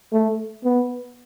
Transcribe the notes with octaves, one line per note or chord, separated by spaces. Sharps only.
A3
B3